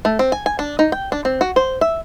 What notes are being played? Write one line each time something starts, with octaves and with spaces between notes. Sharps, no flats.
A3
C4
G#5
G#5
D4
D#4
G5
D4
C4
F#4
C5
E5